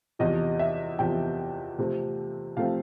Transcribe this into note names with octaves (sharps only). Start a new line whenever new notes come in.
E2 C3 F3 D#5
E5
E2 C3 F3 G5
C3 F3 A3 C4
C3 F3 A3 C4 F5